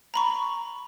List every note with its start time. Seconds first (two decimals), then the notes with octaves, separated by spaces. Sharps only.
0.14 A#5 B5 C#6